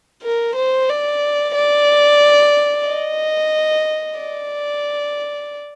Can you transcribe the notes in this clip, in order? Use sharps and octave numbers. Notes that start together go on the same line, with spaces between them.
A#4
C5
D5
D5
D#5
D5